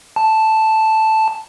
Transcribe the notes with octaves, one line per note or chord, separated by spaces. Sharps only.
A5